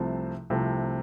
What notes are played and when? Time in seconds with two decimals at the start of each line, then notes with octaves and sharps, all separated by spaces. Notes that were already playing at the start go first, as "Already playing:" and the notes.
Already playing: C2 C3 F3 A3 C4
0.50 C2 C3 F3 A3 C4